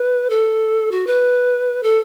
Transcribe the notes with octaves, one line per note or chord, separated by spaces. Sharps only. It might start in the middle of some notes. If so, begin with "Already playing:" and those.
Already playing: B4
A4
F#4
B4
A4